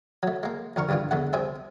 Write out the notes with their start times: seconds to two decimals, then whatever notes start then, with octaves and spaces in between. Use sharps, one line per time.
0.23 F#3 A3
0.43 G#3 A#3
0.76 F2 D3 A#4 C#6
0.89 C2 G2 D3 E3 F4
1.11 E2 D3 A3 F#5
1.33 C2 C3 G#4 C5 E5